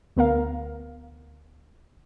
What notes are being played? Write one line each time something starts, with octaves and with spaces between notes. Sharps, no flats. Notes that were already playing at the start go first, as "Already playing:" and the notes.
D2 B3 A#4 F5